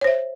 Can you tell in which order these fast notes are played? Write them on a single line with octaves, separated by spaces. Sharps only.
C#5 C5 E5